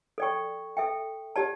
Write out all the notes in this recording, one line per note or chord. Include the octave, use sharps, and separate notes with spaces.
A4 D5 G5 C#6
A4 E5 G5
G4 D5 A5